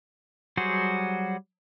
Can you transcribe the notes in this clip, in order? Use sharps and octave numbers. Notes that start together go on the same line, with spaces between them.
F#3 G3 F#4 G#4 C5